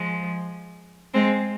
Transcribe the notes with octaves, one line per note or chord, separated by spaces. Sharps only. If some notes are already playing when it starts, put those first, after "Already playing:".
Already playing: F3 G#3
G#3 C4